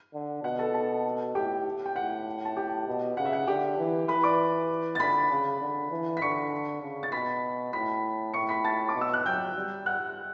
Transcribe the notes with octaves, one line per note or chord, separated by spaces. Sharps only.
D3
B2 F#5
A4 A5
A4 A5
A2 G4 G5
G5
A2 F#5
A5
G4 G5
B2
C#3 F#5
E5
F#5
D3 G4 G5
E3
E3 B4 B5
D5 D6
A6
D3 B5 B6
C#3
D3
E3
B6
D3 C#6 C#7
C#3
A6
B2 B5 B6
A2 B5 B6
A2 C#6 C#7
B5 B6
A5 A6
D6
B2
E6
F#6
F#3 G5 G6
G3
F#5 F#6